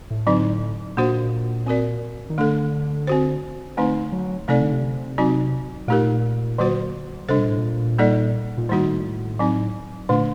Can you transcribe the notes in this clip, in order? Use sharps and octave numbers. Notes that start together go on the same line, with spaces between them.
A2
D3 F#3 C4 D#4
A#2 A#3 D4 F#4 C5
C4 F#4 A#4 D5
D#3
D3 A3 D4 A4
C4 F#4 C5
D3 A3 C4 D#4
F#3
C3 A3 C4 D#4 A4 D5
D3
C3
F#3 C4 D#4 F#4
A#2 A3 D#4 G4 A#4
D3 F#3 A#3 F#4 C5
C3 G3 D4 A4 C5
A#2
A2
A#2
G3 A#3 D#4 A4 D5
A#2
A2 D#3 G3 A#3 D#4 F#4
F#3 C4 D#4
A#2 D3 A3 D4